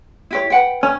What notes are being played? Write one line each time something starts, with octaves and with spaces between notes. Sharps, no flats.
E4 G4 C#5
B4 F#5 G5
C#4